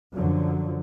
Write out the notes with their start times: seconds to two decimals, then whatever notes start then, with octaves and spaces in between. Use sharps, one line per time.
0.13 F#2 D3 F3 F#3